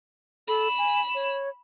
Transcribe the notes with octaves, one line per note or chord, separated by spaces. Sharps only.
A4 B5 E7
G#5
C#5